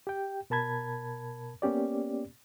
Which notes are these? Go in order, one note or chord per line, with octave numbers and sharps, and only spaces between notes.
G4 G5
B2 A#4 A5 B5 G#6
A#3 B3 C#4 G4 D5